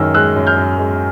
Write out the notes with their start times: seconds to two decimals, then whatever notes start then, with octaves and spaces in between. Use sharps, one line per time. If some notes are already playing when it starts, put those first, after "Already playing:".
Already playing: F#2 D#3 G#3 E6 F6
0.14 G#3 E6 F#6
0.36 F#2
0.47 F6 G6
0.57 F#2
0.78 G#3